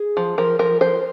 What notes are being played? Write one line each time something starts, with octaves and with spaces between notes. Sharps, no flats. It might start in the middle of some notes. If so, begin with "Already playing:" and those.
Already playing: G#4
F3
F3 A#4
F3 A#4
F3 C5